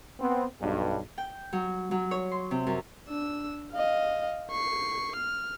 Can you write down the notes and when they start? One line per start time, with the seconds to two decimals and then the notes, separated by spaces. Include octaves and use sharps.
0.19 B3 C4
0.61 B1 G2
1.18 G5
1.53 F#3
1.91 F#3
2.11 C#5
2.32 C6
2.51 C3
2.67 F#2
3.08 D4 E6
3.72 D#5 F5
4.51 C#6 C7
5.16 F6